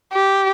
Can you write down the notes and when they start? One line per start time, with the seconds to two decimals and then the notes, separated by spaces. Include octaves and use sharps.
0.13 G4